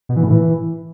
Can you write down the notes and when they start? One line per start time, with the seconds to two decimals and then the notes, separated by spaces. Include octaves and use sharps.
0.09 B2
0.16 E3
0.24 A2
0.31 E3